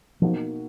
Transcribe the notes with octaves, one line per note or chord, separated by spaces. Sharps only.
B2 F3 A#3 D#4 F#4